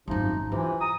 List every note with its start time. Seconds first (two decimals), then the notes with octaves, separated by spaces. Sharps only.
0.08 G#1 F#2 C3 F3 D#4
0.52 C3 E3 F3
0.81 A#5 D#6